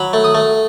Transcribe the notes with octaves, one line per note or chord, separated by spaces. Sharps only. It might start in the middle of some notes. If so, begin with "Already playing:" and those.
Already playing: F#3 B5
A3
D#6
A3